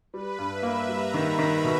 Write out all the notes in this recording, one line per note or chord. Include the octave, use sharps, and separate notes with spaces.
G3 B4
G2
E5
A#3
G3 A#5
D#3
B5
D#3
B2